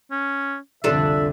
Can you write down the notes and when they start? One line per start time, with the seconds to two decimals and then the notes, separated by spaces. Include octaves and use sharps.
0.11 C#4
0.84 C2 F2 D3 D4 F4 A4 E5